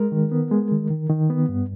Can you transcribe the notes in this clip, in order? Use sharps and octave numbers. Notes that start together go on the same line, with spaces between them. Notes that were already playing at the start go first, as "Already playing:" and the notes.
Already playing: G#3 A#4
D#3
B3
G#3
D#3
D#3
D#3
B3
G2